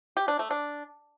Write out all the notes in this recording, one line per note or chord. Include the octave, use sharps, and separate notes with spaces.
G4
D4
A3
D4